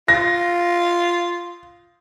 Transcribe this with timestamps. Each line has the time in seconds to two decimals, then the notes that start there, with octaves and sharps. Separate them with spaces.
0.08 F4 A#6